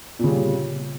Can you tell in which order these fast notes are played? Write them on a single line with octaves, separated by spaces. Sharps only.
A#2 C#3 G3